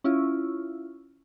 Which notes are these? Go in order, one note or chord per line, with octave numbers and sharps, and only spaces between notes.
C#4 E4 F4